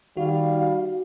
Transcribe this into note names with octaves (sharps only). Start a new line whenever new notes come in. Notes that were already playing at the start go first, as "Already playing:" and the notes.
D#3 G3 F#4 F5